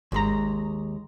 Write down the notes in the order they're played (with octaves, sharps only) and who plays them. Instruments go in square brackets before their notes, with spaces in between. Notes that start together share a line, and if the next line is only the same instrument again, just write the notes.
[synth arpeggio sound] G#1 A#5 [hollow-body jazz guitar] D#2 G#3